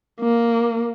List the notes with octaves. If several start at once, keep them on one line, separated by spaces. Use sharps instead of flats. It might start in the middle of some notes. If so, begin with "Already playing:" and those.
A#3